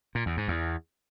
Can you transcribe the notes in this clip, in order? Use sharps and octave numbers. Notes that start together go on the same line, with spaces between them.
A#2
E2
G#2
E2